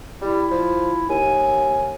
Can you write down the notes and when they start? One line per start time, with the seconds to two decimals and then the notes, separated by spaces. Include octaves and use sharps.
0.21 G3 E4
0.51 F3
1.09 D#2 G#5